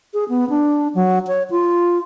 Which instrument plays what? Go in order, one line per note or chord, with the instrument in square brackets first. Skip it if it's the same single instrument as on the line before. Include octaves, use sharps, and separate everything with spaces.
[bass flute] G#4
B3
D4
F#3
C#5
F4